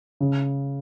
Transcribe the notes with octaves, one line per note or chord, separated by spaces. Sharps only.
C#3